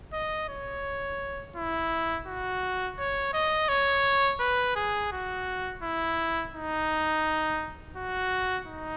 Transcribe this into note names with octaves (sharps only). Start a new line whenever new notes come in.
D#5
C#5
E4
F#4
C#5
D#5
C#5
B4
G#4
F#4
E4
D#4
F#4
D#4